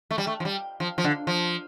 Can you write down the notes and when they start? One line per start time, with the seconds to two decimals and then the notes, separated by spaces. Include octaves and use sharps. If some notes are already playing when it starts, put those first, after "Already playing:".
0.11 A3
0.18 G3
0.27 A3
0.40 F3
0.45 G3
0.80 F3
0.98 F3
1.04 D3
1.27 F3